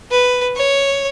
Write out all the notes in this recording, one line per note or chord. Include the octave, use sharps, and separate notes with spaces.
B4
C#5